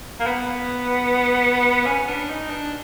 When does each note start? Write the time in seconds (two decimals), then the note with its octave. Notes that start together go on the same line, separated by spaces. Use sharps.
0.20 A#3
0.27 B3
1.86 C#4
2.08 D4
2.30 D#4
2.50 D4